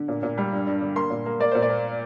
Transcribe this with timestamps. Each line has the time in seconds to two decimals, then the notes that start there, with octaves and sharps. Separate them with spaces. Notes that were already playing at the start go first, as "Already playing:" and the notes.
Already playing: D3
0.08 A#2
0.23 A#2
0.38 G3
0.52 G2
0.67 G2
0.82 D3
0.96 A#3 C6
1.10 A#2
1.26 A#3
1.40 A#3 D5
1.51 A#2 C5
1.62 D5
1.69 A#3